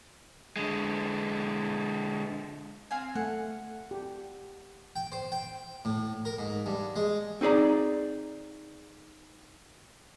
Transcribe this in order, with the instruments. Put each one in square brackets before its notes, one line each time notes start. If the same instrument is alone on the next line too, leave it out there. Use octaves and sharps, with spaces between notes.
[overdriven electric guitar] D3 G#3
[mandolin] C4 F5 G#5
[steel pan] A3 [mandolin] F#5
[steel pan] G4
[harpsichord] G5
C5
G5
A2
A#4
G#2
G2
G#3
[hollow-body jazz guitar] C4 D#4 G#4 D5 A#5